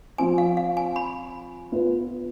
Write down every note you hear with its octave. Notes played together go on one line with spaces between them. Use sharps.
F3 C4 F4 C5 G#5
F5
F5
G#5
B5
B3 F4 B4